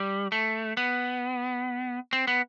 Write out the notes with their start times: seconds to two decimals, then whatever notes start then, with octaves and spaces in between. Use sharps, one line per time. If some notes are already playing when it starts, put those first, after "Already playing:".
Already playing: G3
0.32 A3
0.77 B3
2.13 C4
2.27 B3